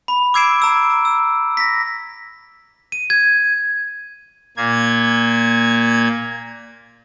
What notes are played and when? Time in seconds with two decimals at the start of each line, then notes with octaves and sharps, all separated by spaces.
0.08 B5
0.34 D6 E6 G#6 C7 D7 E7
0.60 A#5 E6 D7
1.05 E6
1.57 A#6 B6
2.92 D#7
3.10 G#6
4.57 A#2 A#3 G#6